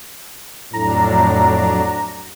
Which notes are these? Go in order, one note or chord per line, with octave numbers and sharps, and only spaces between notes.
F2 A2 F#3 D4 A#5